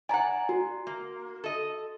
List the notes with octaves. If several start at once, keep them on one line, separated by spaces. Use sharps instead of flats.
D5 F#5 G#5 A#5
F#4
A#3
A4 D#5